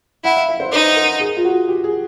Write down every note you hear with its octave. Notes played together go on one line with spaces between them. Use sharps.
E4 F#5
F5
E5
C5
D#4 B4
A#4
G#4
F4
F#4
G4
G#4